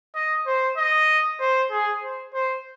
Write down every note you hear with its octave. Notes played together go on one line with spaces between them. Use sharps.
D#5
C5
D#5
C5
G#4
C5
C5